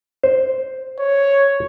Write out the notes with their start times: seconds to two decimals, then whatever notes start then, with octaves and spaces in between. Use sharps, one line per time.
0.23 C5
0.99 C#5